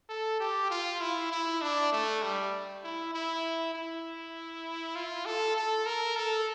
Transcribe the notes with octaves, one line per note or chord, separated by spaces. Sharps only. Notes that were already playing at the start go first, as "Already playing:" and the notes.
A4
G4
F4
E4
E4
D4
A3
G3
E4
E4
E4
F4
A4
A4
A#4
A4